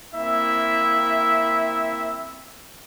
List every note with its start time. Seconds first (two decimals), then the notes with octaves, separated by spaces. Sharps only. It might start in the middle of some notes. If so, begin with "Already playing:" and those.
0.15 A#3 C4 E4 E5